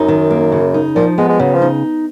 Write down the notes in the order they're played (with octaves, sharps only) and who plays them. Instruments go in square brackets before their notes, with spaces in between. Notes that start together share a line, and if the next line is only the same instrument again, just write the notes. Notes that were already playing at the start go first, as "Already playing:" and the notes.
Already playing: [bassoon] F#2 [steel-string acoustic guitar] D#4
[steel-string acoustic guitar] D#3
A#3
C#3
D#4
[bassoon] A#2 [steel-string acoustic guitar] F3
[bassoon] G#3 [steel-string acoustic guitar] B3
[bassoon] G#3
[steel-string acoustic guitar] C#3 [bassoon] F#3
[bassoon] F3
[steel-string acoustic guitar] D#4